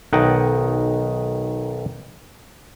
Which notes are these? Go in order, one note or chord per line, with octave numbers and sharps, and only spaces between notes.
B1 D#3 D#5 F#5 G5